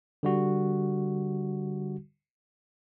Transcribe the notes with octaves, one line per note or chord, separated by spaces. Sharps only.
D3 G3 F#4